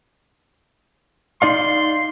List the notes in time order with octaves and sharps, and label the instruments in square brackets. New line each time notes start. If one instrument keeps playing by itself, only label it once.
[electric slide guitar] D#4 D5 F5 [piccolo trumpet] C6